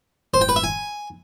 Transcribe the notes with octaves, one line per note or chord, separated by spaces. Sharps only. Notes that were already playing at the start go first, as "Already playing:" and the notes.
C5
G5
B4
E5
G#5